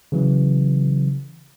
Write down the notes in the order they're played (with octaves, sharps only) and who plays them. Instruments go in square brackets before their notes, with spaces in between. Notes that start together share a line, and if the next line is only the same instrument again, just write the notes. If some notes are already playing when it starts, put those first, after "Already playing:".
[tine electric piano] C#3 E3 F#3